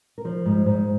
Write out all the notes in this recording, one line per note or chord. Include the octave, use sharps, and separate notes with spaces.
A#4
F3 C5
G#2
G#2